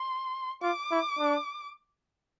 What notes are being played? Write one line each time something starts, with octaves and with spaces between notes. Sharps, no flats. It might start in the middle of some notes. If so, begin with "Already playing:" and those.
Already playing: C6
F4 D6
E4
D4